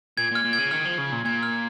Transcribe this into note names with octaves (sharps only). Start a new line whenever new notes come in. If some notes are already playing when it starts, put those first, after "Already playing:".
A#2 G#6
A#2
F6
A#2
G#6
C#3
D#3 F6
F3
C#3
A#2
A#2 G#6
F6